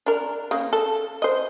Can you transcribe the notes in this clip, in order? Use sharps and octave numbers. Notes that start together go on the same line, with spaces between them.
D4 A#4
C#3 A#3
A4
C5 D#5